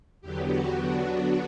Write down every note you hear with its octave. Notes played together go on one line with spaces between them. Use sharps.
E2 D3 F#3 B3 G4
F#4
D3 F#3 B3 D4